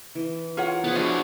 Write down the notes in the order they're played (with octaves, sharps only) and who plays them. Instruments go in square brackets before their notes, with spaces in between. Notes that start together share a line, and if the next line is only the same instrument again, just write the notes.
[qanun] E3
[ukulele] F4 C#5 F#5 [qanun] A#4
[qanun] F3 G#4 [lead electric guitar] B3
[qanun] D4 [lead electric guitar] E4 F#4 [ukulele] B4